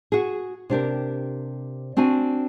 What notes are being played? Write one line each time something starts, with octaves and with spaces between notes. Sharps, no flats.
F#4 G#4
C3 D4 G4 A#4
C4 D4 F#4 G#5